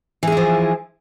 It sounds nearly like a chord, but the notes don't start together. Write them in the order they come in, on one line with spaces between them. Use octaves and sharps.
E3 G#4 E4 F3